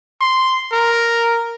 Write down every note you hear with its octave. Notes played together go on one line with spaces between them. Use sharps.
C6
A#4